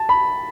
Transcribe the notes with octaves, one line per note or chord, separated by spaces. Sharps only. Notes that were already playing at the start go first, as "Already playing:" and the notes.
Already playing: A5
B5